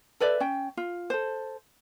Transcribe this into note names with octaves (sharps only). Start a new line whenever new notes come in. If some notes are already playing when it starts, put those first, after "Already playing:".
A4 B4 D5 E5
C#4 G5
F4
A4 C5